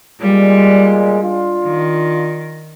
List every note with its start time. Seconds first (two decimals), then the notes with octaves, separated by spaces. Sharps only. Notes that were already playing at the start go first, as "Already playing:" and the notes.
0.20 A#2 G3 G#3
1.20 D4 F4
1.65 D#3